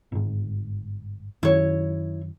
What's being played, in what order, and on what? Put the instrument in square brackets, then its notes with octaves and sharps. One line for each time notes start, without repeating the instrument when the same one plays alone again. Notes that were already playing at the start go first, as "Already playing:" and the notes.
[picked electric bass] G1 G#2
[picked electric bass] F#2 D#3 [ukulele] E4 C#5